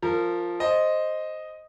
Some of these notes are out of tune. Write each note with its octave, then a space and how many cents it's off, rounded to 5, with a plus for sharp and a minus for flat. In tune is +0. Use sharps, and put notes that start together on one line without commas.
F3 +0 A#4 -25
C5 +0 D#5 +0